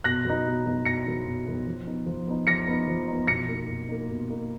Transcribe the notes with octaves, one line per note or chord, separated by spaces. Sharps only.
B2 F#6 A#6
F#3 B3 D#4
B2
F#3 B3 D#4
B2 A#6 C#7
F#3 B3 D#4
B2
F#3 B3 D#4
F3
B3 D#4
F3
B3 D#4
F3 A#6 C#7
B3 D#4
F3
D#4
B3
B2 A#6 C#7
A#3 D#4
B2
A#3 D#4
B2
A#3 D#4